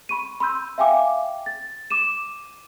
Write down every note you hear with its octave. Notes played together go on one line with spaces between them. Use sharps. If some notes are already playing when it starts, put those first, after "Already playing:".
B5 C#6 D#7
B5 C6 E6 G6
E5 F5 G5 G#5 D6
A6
D6 D#7 E7